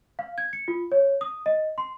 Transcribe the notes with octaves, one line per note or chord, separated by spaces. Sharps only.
F5
G#6
C#7
F4
C#5
D#6
D#5
C6